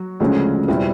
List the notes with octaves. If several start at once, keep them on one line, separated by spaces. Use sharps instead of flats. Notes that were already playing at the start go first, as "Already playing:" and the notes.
Already playing: F#3 F#4
D2 C#3 F3 G#3 C#4
E2 B2 G3 C4 E4 F4